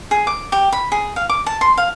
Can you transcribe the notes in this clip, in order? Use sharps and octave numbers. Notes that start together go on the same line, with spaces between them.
G#4
D6
G4
B5
G#4
F5
D6
A5
C6
F5